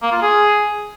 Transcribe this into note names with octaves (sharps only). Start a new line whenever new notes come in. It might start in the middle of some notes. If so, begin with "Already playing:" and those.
A#3
F4
G#4